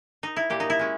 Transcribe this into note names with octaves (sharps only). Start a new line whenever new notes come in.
D#4
E4
A#2 G4
D#4
E4
G#3 C#4